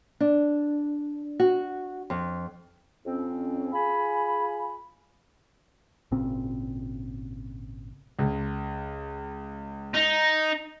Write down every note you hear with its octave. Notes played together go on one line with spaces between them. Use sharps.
D4
F#4
F2
F2 C4 C#4
F4 G#4 G#5 B5
G#1 A#2 C#3 C4
C#2
D#4